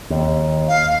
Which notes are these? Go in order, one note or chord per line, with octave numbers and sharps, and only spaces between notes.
D#2
F5